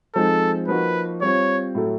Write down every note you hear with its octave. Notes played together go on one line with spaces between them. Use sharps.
F3 G#3 C4 D#4 A4
F3 A#3 D#4 F#4 B4
G3 C4 F4 C#5
A2 F#3 A3